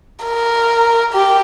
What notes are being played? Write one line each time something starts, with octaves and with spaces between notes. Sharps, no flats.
A#4
G4